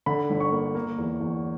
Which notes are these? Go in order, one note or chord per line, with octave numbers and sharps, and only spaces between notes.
D3 B5
G1
C#6
A#3
A#3
E2
E2